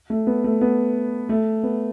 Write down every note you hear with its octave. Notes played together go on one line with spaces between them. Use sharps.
A3
B3
A3
B3
A3
B3